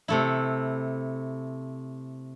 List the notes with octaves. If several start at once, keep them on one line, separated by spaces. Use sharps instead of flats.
C3 A3 E4